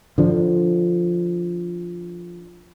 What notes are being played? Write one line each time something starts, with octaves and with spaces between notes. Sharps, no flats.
D3 F3 D4